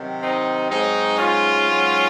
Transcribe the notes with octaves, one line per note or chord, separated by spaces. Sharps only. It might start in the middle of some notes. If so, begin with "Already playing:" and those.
Already playing: C3 D#3 F#3
C4 D#4
G#2 F#3 C4 D#4
C#4 F4
G#2 F#3